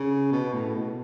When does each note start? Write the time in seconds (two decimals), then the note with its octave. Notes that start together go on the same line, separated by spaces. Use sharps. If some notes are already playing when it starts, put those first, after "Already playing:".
Already playing: C#3
0.32 B2
0.53 A2
0.74 B2